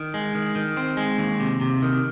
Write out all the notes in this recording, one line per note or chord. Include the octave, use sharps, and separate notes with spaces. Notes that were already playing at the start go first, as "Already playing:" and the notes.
Already playing: D#3
G#3
D#3
D#3
C4
G#3
D#2
C3
C3
D#3